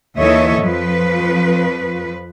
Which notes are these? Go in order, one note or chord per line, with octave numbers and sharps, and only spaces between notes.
D#2 E3 A4 C#5 D#5 E5
F2 F3 B4